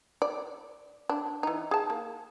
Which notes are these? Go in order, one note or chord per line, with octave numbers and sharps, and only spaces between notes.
D5
D4
E3 D#4
G#4 A5
A#3